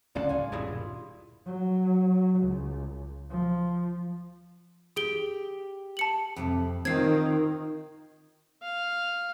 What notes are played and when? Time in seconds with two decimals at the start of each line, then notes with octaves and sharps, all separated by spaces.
0.15 D1 C#2 C#4 D4 F4 D5 F#5
0.29 C#5 G#5
0.52 D#1 G2 B2 E4 G#4
1.46 F#3
2.40 C#2
3.30 F3
4.96 G4 G#4 D7 G7
5.97 A5 C#7 F#7
6.36 F2 A2 C3
6.85 D#3 C4 F4 G#6 C7
8.63 F5